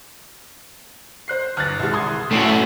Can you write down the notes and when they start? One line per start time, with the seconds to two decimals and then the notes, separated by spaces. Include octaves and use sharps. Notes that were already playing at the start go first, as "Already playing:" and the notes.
1.28 C5 F#6 C7
1.57 G1 F6 F#6 A6
1.80 C2 G#3
1.94 C6 D#6 G#6
2.31 A2 A3 C#4 F#4 B6 C7 D7
2.44 E5